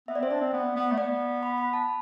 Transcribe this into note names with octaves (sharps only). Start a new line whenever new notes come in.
B3 E5
D5
C4 C5
D4 D5
C4
B3
B3
A3
B3 D5
B5
B5
A5